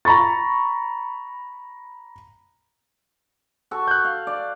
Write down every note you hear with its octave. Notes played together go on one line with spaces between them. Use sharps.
A#5 B5 C#6 A6
F#4 A4 C#6
F#6 G6
F5
D5